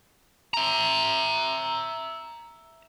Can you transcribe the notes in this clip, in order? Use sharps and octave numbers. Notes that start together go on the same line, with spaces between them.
E5 A#5